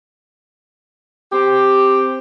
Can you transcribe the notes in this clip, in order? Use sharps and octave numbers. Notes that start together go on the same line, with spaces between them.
C4 G4